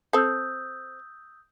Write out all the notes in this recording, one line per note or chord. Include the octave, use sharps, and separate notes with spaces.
C4 A4 D#6 E6 G6